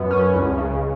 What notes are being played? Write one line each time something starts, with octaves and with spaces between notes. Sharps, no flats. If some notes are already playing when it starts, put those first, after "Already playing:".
Already playing: F#2 B3
C#4
C#2
C#3